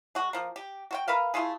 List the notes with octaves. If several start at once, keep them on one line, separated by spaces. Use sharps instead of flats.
G#3 F#4
F3 A#3
G4
F#4 C5 G5
A#4 B4 E5 F5
A3 E4 F4 G#4